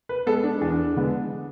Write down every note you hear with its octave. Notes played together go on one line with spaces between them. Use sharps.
B4
G#3 B3 A4
D4
E2 D4
D3 G#3 B3